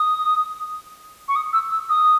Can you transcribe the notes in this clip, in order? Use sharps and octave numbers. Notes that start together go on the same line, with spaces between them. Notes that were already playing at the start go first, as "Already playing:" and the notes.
Already playing: D#6
C#6
D#6
E6
E6
D#6